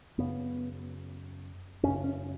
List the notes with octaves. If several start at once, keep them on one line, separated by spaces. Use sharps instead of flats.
F#2 C#3 B3
F#2 C#3 C#4
C#4